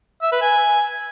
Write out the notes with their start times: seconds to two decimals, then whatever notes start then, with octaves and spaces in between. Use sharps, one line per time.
0.22 E5
0.32 B4
0.42 G#5